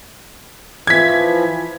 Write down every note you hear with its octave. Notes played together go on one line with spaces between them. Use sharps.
E3 F3 G#6 B6